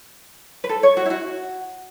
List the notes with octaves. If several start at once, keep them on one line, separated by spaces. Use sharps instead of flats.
B4
A4
C#5
F#4
E4
F#4